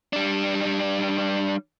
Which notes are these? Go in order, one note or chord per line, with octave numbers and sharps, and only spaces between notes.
G3 D4